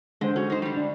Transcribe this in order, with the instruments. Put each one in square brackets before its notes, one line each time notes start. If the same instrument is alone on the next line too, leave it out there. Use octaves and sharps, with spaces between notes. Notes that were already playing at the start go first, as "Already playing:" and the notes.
[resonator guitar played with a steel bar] D3 [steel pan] G#3 C5
[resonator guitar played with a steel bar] C#4 [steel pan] F#4 A4
[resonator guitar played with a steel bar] D#4 C5
D3 G3
[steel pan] D4